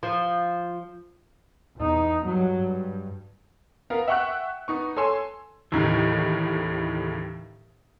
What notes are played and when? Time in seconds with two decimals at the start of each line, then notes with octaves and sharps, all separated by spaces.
0.03 F3
1.77 E2 D#4
2.24 G2 F#3
2.61 G2
3.90 B3 A#4 F5
4.07 E5 F#5 G5 C#6 E6 F#6
4.68 B3 D#4 C#6
4.97 A4 C#5 G#5 C6 E6
5.72 D#2 A2 C#3 E3 D#4